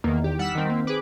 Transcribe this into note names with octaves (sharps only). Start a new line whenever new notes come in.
E2 D#3 A#3
G4
G3 F#5 E6 B6
D#3 C4
A#3
G#4 B4 D6